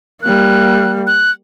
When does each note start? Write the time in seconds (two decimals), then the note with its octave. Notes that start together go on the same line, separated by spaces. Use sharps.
0.22 G3 A#3 F#6
1.07 F#6